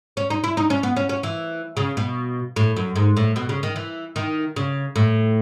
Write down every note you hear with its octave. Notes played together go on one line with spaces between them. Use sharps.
C#4
D#4
E4
D#4
C#4
B3
C#4
C#4
E3
C#3
B2
A2
F#2
G#2
A2
B2
C#3
D#3
E3
D#3
C#3
A2